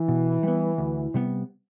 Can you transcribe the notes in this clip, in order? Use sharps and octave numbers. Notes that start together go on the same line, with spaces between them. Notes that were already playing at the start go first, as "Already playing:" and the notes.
Already playing: E3
B2
G3 B3
D2
C3 G3 B3